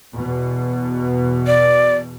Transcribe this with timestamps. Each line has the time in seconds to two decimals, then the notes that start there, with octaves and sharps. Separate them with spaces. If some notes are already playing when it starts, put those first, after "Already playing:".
0.17 E2 B2
1.47 D5